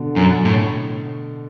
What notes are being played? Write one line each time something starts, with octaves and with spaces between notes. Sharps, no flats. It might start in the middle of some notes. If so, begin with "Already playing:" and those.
Already playing: B2 D3
F#2
A2